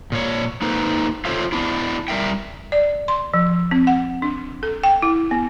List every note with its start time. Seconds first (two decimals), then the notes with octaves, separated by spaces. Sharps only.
0.12 A#2 C#5
0.62 A#3 D#4 A4 B4 C5
1.25 F4 A4 C5 C#5 E5 F5
1.52 B3 D4 E4
2.08 G3 A#4 E5 G5
2.72 D5
3.08 C6
3.34 F3
3.71 C4
3.87 F#5
4.22 D4
4.63 A4
4.83 G5
5.02 E4
5.31 B3